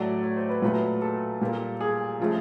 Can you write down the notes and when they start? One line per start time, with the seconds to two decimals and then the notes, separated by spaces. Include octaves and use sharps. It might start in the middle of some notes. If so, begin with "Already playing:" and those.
Already playing: A2 F#3 A3 D5
0.23 C#5
0.36 C5
0.49 B4
0.62 A#2 F#3 A3 B4
1.02 A4
1.41 A#2 G3 A#3
1.81 G#4
2.20 C#3 F3 A3